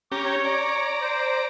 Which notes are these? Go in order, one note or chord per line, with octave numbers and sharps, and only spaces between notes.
C#4 G4 A#5 D6
C#5
D5 A#5
C5